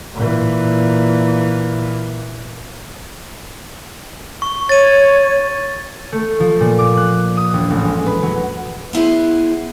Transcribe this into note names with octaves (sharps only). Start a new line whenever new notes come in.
A#2 E3
C#6
C#5 A6 D#7
A3
F3
A#2
D6
F#6
D#6
E1
A1
G#3
B4
F#3
B3 E4 G#4 C5